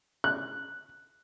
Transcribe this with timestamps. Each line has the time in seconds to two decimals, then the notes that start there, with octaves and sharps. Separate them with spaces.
0.24 F#6